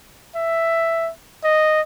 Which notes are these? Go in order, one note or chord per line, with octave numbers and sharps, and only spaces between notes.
E5
D#5